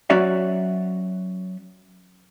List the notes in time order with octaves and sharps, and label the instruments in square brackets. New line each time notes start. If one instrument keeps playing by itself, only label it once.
[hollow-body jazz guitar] F#3 C#4 F#4 C#5 D5 E5